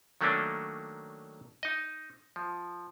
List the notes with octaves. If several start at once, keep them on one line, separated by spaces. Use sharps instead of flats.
D#3 F#3 A3 A#3 C#4 D4
D#4 D#5
F3